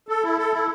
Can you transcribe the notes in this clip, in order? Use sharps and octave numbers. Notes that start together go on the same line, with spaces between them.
A4
E4
A4
E4